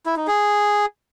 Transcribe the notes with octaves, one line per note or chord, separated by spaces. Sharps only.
E4
D#4
G#4